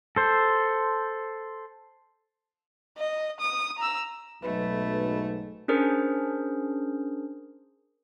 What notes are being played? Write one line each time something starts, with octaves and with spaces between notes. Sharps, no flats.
A4 C5
D#5
D#6
A#5 E6
B1 G#2 A3 B4
C#4 D4 G#4 A#4 C5